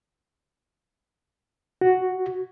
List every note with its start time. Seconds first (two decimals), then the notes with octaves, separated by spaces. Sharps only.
1.81 F#4